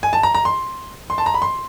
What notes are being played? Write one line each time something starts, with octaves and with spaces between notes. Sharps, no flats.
G#5
A5
A#5
A#5
C6
C6
A5
A#5
B5
C6